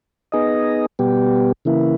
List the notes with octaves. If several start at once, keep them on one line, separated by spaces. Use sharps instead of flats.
B3 D#4 G#4 D#5
B2 G3 B3 G4
C#3 E3 A#3 E4